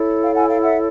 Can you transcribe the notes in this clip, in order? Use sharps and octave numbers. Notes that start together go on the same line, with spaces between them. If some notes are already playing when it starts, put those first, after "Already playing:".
Already playing: E4 A4 C#5
F5 G5
F#5 G#5
F5 G5
E5 F#5